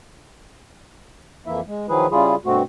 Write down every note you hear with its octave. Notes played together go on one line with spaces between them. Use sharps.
F2 E3 A#3 E4 E5
G#3
D#3 F3 F#3 E4 G#4 B4
C#3 G3 E4 F4 G#4
G2 B2 A3 C4 F#4